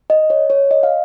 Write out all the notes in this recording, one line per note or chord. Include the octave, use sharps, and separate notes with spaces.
D#5
C#5
C#5
D#5
F5